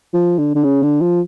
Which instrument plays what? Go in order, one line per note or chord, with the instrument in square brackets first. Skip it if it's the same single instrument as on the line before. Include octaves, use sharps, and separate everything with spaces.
[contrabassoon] F3
D3
D3
C#3
D3
F3